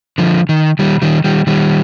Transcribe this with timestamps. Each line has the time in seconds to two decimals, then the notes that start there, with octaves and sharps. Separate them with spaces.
0.18 D3 F3
0.49 D#3
0.79 D#3 G3
1.02 D#3 G3
1.24 D#3 G3
1.47 D#3 G3